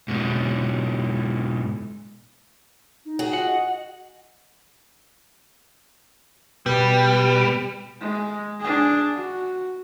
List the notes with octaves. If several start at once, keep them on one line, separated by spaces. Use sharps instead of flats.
G#2 B2
D#4
F#4 G#4
F4 F#5
D#5
B2 G3 B4
G#3
D4 G#4
F#4